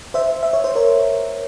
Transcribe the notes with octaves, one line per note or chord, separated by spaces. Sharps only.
C5 E5
E5
C#5
C5
A#4 C#5